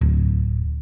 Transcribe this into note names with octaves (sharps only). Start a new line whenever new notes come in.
D1